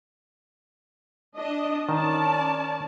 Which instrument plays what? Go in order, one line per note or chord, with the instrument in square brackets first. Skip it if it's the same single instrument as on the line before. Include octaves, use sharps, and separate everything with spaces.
[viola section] D4 D#5
[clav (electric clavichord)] D#3 [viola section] C#4 D5 A5